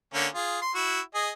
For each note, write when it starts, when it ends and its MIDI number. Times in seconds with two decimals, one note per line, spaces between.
0.14 0.27 50
0.14 0.27 58
0.14 0.27 61
0.34 0.60 65
0.34 0.60 68
0.62 0.73 84
0.75 1.00 64
0.75 1.00 66
1.15 1.31 68
1.15 1.31 75